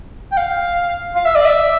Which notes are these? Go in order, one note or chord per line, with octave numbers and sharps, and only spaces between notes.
G5
F5
F5
E5
D5
E5